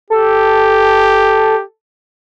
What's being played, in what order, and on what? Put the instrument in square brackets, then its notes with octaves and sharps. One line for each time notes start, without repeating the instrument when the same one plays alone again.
[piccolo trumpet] G4 [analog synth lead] A4